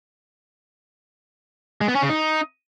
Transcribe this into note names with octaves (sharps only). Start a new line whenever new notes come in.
G#3
B3
C#4
C#3
D#4